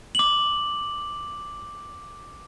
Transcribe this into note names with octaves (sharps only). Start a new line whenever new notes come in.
D6 F#7